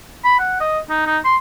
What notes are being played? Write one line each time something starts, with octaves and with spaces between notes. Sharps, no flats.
B5
F#5
D#5
D#4
D#4
C6